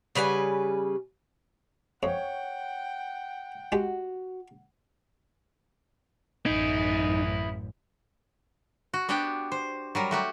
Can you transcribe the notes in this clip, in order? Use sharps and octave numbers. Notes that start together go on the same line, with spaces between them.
C#3 G3 B4 G#5
F2 C#5 F#5 G5
G#3 F#4 G4
A1 F#2 D#4 E4 G#4
F#4
B3 D4 F#4 G4 G5
C5
F#3 G3 A#4
A3 F#4 G4